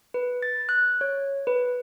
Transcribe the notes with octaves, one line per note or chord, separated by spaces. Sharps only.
B4
A6
F#6
C#5
B4